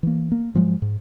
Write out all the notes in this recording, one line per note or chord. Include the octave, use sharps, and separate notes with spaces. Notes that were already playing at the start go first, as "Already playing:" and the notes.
E3 A#3
A#3
G#2 F3 F#3 G#3
G#2